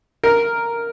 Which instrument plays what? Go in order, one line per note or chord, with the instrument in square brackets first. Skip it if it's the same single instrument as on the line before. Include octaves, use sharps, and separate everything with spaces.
[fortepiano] A#4